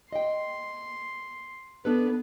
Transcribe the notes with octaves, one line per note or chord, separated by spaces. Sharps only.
D#5 G5 C6
B3 D4 A4 B4